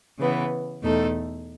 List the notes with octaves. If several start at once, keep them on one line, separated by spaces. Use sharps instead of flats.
C#3 E3 B3
E2 B2 A3 D#4 A4